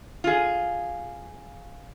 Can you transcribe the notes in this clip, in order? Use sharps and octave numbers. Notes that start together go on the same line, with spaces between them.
F4 G#4